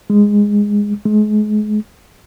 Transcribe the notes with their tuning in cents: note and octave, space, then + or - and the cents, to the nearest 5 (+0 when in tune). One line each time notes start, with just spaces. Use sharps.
G#3 -10
G#3 +35